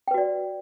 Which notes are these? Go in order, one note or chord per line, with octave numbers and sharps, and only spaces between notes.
F#4 B4 D5 G5